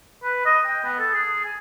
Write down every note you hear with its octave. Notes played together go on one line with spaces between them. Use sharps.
B4
D#5
G5
B3
A4
G#4
G#5